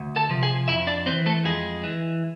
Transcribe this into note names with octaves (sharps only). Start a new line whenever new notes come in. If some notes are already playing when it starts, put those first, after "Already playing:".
Already playing: D2
A4 A5
C3 F3
G#4 G#5
F2 E4 E5
D4 D5
E3 C4 C5
A3 A4
F2 G#3 G#4
E3